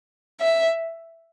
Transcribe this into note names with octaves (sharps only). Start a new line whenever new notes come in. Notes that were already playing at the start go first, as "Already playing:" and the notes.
E5